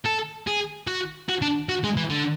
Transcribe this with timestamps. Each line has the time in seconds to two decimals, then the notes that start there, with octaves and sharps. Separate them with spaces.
0.06 A4
0.47 G#4
0.87 F#4
1.29 F#4
1.42 D4
1.69 F#4
1.84 G#3
1.97 E3
2.10 D3